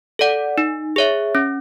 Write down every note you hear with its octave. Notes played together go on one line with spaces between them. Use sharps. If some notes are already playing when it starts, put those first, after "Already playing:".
A4 D5 F#5
D#4
G#4 C#5 E5
C#4